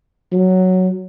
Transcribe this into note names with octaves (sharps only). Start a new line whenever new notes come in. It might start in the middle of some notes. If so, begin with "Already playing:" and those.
F#3